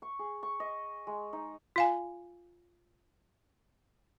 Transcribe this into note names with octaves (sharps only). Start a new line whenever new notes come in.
C#6
G#4
C#6
D#5
G#3
D#4
F4 F5 G#5